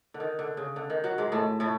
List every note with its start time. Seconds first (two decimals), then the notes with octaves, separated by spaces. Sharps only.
0.14 D3
0.20 D#3
0.39 D3
0.57 C#3
0.76 D3
0.90 D#3
1.04 F#3
1.18 G#2 G#3
1.32 A2 A3
1.60 A2 A3